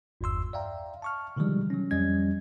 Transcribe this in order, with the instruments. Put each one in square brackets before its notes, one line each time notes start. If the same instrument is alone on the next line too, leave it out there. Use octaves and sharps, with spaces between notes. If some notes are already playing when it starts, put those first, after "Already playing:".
[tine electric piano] G1 E2 G2 C6 E6
D5 E5 F5 G5 A#5
A5 C#6 F6
B2 D3 D#3 F3 G3 G#3
F#3 C#4
F2 F3 G3 C#4 D#5 G#6